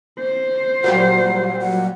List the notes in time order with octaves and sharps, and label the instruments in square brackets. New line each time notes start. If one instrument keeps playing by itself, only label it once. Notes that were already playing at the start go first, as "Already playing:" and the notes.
[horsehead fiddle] C5
[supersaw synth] A#2 F#3 G3 [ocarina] F#5
[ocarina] F#5